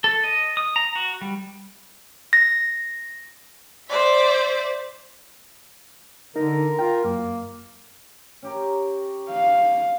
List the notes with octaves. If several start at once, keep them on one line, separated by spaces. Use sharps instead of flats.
A4
D#5
D#6
A#5
F#4
G3
A#6
C5 D5 E5
D3 D#4 A#4
F4 G5
F#2 A#3
C#4 G4 A#4
F5